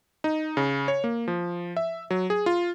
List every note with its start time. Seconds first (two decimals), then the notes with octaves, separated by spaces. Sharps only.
0.24 D#4
0.57 C#3
0.88 C#5
1.04 A#3
1.28 F3
1.77 E5
2.10 F#3
2.30 G#4
2.46 F4